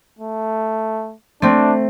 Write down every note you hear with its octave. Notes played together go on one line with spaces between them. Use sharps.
A3
A3 C4 D4